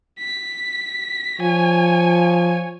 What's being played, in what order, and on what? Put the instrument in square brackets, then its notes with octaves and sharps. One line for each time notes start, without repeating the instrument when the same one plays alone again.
[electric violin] B6
[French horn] F3 [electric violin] C#5 G#5